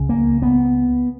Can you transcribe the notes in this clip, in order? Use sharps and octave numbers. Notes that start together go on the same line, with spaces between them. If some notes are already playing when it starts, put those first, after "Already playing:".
Already playing: C#2 C#3
A#3
B3